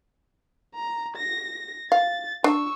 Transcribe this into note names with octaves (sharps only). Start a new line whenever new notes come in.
A#5
A#6
F5 A6
D4 C#6 E6